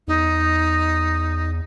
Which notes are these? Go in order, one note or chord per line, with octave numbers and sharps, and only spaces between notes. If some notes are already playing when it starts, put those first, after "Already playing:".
E2 D#4